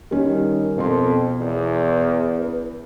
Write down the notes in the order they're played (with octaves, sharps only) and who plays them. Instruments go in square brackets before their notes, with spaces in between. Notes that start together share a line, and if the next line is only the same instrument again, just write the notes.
[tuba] D#3 [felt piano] G3 C#4
[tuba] F2 [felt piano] B2 A#4 C6
[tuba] E2
[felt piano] B4